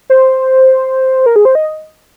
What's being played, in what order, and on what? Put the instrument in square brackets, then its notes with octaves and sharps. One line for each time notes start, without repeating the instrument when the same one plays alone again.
[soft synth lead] C5
A#4
G#4
C5
D#5